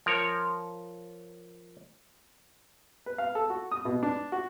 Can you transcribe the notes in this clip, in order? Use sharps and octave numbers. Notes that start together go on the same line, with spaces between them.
F3 A#4 C#5
B4
F5
A4
F#4
D#6
B2
D4
F#4